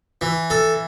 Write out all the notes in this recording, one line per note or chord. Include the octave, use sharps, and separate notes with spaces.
E3
A4